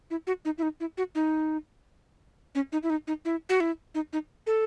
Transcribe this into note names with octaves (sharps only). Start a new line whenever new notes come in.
E4
F#4
D#4
E4
D#4
E4
F#4
D#4
C#4
D#4
E4
D#4
D#4
E4
F#4
E4
D#4
D#4
A4